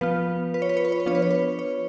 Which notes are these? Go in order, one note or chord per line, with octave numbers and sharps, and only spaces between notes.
F3 B3 F4 B4
B4
C#5
B4
C#5
B4
C#5
B4
F3 B3 D4 F4 C#5
B4
C#5
B4
C#5